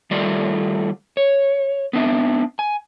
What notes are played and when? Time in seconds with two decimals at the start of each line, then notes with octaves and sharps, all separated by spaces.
0.11 D#3 G3 A3 F4 D5
1.17 C#5
1.93 B3 C4 D4 E5
2.59 G#5